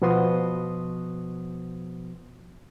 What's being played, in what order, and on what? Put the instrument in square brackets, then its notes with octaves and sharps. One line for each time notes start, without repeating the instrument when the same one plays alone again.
[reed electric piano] B2 F3 B3 F#4 C6 D#6